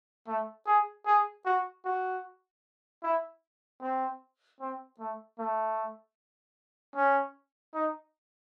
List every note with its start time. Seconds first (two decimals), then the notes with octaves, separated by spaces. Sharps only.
0.27 A3
0.67 G#4
1.06 G#4
1.46 F#4
1.85 F#4
3.03 E4
3.81 C4
4.60 C4
4.99 A3
5.39 A3
6.96 C#4
7.74 D#4